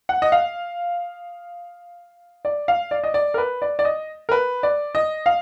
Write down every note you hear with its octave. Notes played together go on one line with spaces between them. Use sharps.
F#5
D#5
F5
D5
F5
D5
D#5
D5
A#4
B4
D5
D5
D#5
A#4
B4
D5
D#5
F5